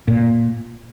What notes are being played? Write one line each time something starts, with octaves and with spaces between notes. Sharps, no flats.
A#2